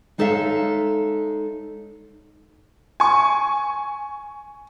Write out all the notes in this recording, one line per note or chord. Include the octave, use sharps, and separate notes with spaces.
G#3 D#4 A4 C#5 E5 F5
G#5 C#6